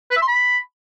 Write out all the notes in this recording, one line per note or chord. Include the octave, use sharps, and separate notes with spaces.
B4
E5
C6
B5